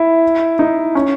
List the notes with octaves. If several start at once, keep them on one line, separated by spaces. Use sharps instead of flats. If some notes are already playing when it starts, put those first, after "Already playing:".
Already playing: E4
D#4
C#4